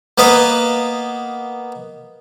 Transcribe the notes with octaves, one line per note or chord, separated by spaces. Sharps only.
A#3 B3 B4 D#5 F5